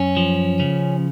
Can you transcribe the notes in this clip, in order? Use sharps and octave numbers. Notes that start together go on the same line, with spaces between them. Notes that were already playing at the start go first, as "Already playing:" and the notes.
Already playing: F#2 C#4
F3
C#3